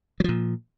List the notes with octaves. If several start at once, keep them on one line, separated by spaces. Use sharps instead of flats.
A#2 F3 F#3